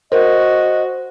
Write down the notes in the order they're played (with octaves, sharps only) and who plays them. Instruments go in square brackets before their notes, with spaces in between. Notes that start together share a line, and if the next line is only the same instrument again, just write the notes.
[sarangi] F#4 [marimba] A#4 [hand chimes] C5 [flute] D#5